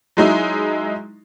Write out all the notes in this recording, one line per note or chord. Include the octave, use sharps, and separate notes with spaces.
F#3 G#3 D#4 E4